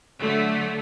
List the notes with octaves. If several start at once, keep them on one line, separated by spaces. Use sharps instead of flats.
D3 F#3 A3